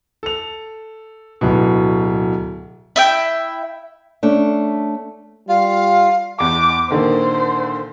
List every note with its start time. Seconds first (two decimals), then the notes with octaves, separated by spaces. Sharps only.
0.23 A4 F7
1.41 D1 B2
2.96 E4 E5 G5
4.23 A3 C#4 D4
5.49 G3 F4 F5
6.40 E2 D6
6.90 A#2 D3 D#3 C5